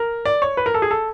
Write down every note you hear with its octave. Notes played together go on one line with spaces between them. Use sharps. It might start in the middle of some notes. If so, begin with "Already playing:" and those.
Already playing: A#4
D5
C#5
B4
A#4
A4
G#4
A4